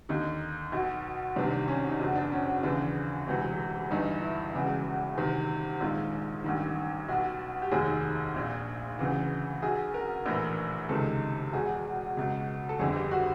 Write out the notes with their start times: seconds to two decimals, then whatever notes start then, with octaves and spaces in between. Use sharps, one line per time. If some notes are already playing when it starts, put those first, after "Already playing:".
0.09 D#2 D3 D#4
0.72 B1 B2
1.36 C2 C3 D#3 D4
1.68 C#4
1.89 D#4
2.00 F#1 E2 B2 D4
2.15 D4
2.32 C#4
2.63 D#2 C#3 E3 D4
3.27 E1 D2 C3 E3
3.91 G1 G2 E3 D#4
4.22 E4
4.54 E1 E2 C#3 E3
5.18 D2 C3 D#3
5.80 A#1 G#2 D#3 F4
6.44 A1 G2 D#3
7.08 B1 B2 F#4
7.62 G4
7.71 F1 D#2 D#3 G#4
8.34 A#1 A#2
8.99 D2 C#3 E3
9.62 B1 B2 G#4
9.94 A#4
10.26 A#1 A2 E3 A#4
10.89 C#2 C3 D#3 A4
11.53 E1 E2 B2 G#4
12.17 C#2 B2
12.69 A4
12.79 G1 F2 D3 G#4
12.96 G4
13.11 F#4